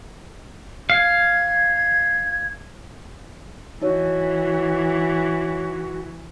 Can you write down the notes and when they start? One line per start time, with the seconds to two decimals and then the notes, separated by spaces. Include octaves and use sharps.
0.90 F5 G#6
3.82 E3 D#4 F#4 C#5